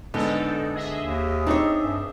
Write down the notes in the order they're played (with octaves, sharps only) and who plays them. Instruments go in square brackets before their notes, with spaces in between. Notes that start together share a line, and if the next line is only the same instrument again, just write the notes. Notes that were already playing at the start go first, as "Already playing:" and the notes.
[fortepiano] G#2 B3 [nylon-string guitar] D3 [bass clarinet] D4 [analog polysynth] D#4 A4
[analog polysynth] G#4 D#5 E5
[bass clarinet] D#2
[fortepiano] C4 D4 [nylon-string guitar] D#4 C#5
[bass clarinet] G2